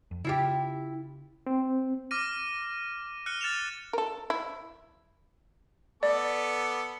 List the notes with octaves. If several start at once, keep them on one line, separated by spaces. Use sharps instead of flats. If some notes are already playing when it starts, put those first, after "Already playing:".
F2
C#3 E4 F4 G4
C4
D6 F6 A#6 D#7
F6 F#6 C#7 D#7 G7
F6 A6 C#7 E7 F7
A4 A#4
E4
B3 A4 D5 D6